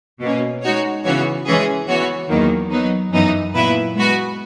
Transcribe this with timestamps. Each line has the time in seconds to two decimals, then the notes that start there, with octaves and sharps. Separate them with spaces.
0.21 B2 A#3 C#4
0.63 G#3 D#4 F#4 C#5
1.04 C#3 E3 B3 F#4 C#5
1.46 E3 G#3 C#4 G#4
1.88 E3 B3 F#4 C#5
2.30 E2 D#3 F#3 A#3
2.71 F#3 B3 D#4
3.12 F#2 E3 B3 D#4
3.55 A#2 F#3 B3 E4 B4
3.96 G#3 B3 F#4 B4